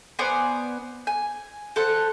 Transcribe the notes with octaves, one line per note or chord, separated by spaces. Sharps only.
B3 C5 D5 G#5
G#5
A4 C5 F#5